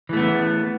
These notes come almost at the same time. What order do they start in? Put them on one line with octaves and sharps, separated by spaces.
E3 A3 B3